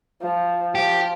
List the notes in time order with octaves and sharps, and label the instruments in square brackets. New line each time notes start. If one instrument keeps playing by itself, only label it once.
[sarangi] F3
[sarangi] F3 [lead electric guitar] G4